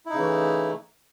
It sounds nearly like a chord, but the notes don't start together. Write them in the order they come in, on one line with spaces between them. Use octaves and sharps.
E4 D#4 C#3 E3 A3